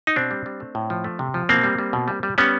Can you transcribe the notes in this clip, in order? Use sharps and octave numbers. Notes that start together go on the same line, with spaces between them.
D#4
B2 C4 D4
G3
G3
A3
A2
F3
A3
C3
F3
B2 A#3 C4
G3
G3
B2
G3
G3
G3 B3 C#4